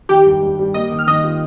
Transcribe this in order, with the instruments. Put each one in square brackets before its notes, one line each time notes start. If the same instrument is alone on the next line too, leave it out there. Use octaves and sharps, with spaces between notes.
[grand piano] D#3 [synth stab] G4 G5
[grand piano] G2
G2
G3
[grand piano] A#3 [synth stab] D#5 D#6
[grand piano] D#3
[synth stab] F6
[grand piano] D#3 [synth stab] D#5 D#6
[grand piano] F4